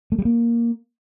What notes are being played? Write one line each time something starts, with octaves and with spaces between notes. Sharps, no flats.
A3
G3
A#3